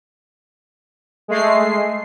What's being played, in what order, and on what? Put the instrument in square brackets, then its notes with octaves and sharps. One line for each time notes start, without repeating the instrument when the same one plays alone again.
[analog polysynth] G#3 A3 C7